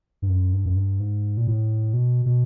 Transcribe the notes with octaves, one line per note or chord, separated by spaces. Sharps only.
G2
F#2
G2
F#2
G2
G#2
A#2
A2
B2
B2